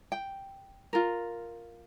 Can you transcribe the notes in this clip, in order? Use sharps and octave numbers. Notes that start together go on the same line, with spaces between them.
G5
F4 A#4